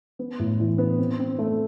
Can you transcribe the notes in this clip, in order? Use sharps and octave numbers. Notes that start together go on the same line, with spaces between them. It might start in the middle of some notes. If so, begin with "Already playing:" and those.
B3
A2
E3
B3
C4
C4
A3